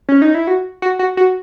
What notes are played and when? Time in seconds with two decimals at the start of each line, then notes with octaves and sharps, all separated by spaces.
0.09 C#4
0.22 D#4
0.35 E4
0.47 F#4
0.82 F#4
0.99 F#4
1.17 F#4